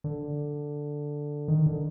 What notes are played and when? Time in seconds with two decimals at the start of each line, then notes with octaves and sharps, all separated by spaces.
0.04 D3
1.48 D#3
1.66 D3